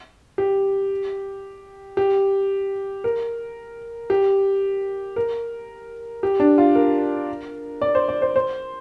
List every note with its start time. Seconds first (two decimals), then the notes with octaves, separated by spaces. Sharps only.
0.38 G4
1.97 G4
3.04 A#4
4.10 G4
5.16 A#4
6.23 G4
6.40 D4
6.58 F4
6.75 A#4
7.82 D5
7.95 C5
8.08 D5
8.22 C5
8.36 C5